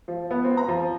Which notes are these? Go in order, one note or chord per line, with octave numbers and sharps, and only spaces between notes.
F3
B3
C4
A#5
F3